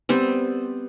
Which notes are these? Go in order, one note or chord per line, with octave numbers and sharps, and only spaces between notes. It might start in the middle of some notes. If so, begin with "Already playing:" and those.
G3 B3 C4